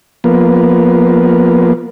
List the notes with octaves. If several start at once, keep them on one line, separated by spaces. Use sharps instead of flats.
F3 A#3 B3